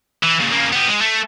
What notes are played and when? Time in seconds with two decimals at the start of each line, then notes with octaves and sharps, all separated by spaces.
0.23 E3
0.40 A#2 C#3
0.52 C#3 A#3
0.73 B3 G4
0.88 G#3
1.01 A3